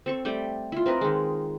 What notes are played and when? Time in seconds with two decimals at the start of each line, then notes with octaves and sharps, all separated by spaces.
0.06 C4 A4 C#6
0.25 G3 A3 D5 G5
0.72 E4 F4
0.86 C4 A#4 B4 D#5
1.01 D#3 G#3